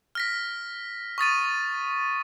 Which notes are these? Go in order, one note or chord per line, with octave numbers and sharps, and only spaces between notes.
F6 A#6 B6
C#6 D#6 A6 D#7